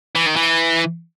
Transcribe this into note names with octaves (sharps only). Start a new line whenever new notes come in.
E3
D#3
E3